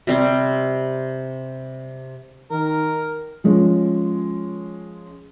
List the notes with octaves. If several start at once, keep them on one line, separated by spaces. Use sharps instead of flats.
C3 G3 C4
D#3 A#4
F3 G#3 C#4